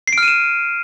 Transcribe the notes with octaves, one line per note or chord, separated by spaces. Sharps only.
C7
D7
F6
D#7
E7